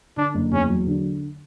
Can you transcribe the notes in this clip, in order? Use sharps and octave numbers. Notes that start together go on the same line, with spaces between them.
D3 D4
F#1
E2 C#4
F#3
D3